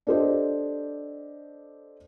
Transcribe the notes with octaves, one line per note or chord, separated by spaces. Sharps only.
D4 G4 A4 C5 D#5